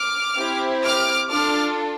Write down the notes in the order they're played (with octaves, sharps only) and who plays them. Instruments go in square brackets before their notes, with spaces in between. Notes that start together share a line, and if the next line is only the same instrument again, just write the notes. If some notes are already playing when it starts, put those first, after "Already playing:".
Already playing: [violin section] D6 F6
C4 E4 G4
D6 F6
D4 F4 A4 D6 F6